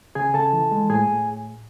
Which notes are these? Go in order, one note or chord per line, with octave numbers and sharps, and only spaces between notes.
C#3 G#4 G#5
C#3 A4 A5
E3
G#3
A2 G#4 G#5
A2